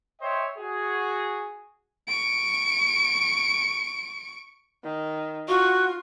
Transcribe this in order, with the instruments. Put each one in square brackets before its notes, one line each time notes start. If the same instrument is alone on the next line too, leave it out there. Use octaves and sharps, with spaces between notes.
[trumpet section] C5 C#5 D#5 E5 G5
F#4 G#4
[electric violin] C#6 D7
[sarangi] D#3
[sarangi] F4 [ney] F#4 [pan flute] C#6